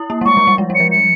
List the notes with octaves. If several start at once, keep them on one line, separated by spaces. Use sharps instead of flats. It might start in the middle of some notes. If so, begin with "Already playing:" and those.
Already playing: E4
A#3
G3
G#3 C#6
F3
G3
G#3
G3
F3 C#7
C#7